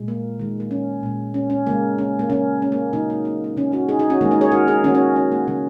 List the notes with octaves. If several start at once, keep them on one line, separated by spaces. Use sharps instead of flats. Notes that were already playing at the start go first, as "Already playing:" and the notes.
Already playing: A#2 G#3
A#3
D#3 G#3
A#3
C#4
A#2 G#3
C#4
C#4
C#3 G#3 A#3
C#4
A#3
C#3 A#3 C#4
C#4
A#3
C#3 F#3 A#3 D#4
A#3
A#3
A#3
C#3 A#3 C#4
C#4 F#4
D#4 G#4
D#4 G#4
C#4 F#4
D#3 G#3 A#3 D#4
A#3 D#4
G#4 C#5
F#4 A#4
D#4 G#4
D#3 A#3 C#4 F#4
C#4 F#4
C#4
A#3
C#3 F#3 A#3